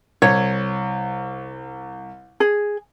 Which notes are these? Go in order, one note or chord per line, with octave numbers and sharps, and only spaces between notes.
C2 C#5
G#4